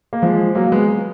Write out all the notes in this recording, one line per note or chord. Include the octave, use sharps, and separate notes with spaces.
A#3
F3 G#3
F#3 A#3
G#3 B3